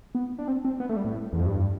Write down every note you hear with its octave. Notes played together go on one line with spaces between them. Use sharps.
B3
D4
C4
C4
B3
A3
G3
A2
E2
F2
G2